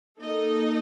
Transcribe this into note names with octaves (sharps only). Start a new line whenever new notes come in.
A#3 D#4 A4 D#5